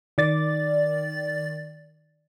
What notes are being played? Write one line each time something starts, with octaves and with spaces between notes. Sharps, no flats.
D#3 D5 A6